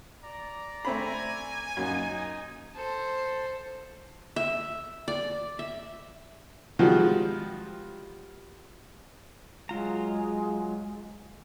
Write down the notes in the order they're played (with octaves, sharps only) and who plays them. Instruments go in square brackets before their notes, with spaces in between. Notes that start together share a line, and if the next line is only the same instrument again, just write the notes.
[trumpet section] D5 A#5
[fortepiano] A3 C4 B5 [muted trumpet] G#5
[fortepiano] F#2 A#3 [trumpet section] D#4
[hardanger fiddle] A4 C5
[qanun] E5
D5
E5
[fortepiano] D#3 F3 G3 G#3 F4 F#4
[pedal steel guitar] F#3 F4 A#5 [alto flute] G#3